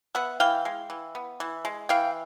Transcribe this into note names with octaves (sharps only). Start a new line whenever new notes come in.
B3 E5 F#5
E3 F5 G5
G#3
E3
B3
E3
G#3
E3 F5 G5